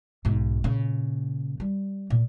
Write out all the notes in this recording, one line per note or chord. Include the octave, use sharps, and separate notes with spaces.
B1 G#2
A#2 C#3
G3
A#2